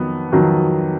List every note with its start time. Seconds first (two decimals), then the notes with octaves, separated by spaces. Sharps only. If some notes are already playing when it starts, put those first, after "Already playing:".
Already playing: F2 D#3 F#3 B3
0.32 F2 D#3 F#3